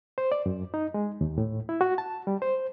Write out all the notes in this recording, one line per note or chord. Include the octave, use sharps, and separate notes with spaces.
C5
D5
F#2
D#4
G#3
D#2
A2
E4
F#4
A5
G3
C5